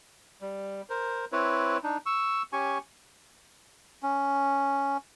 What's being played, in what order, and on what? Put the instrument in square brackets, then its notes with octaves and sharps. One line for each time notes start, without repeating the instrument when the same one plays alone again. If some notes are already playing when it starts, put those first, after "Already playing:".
[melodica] G3
A#4 C5
C4 E4 B4 C#5
D4 D#4
C#6 E6
C#4 G4 G#5 C#6
C#4